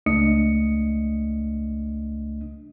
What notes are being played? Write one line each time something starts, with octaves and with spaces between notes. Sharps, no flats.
C#2 A3 D4 D#5 D#6 C#7